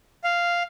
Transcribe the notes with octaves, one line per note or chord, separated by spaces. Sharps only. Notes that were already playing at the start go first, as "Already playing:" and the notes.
F5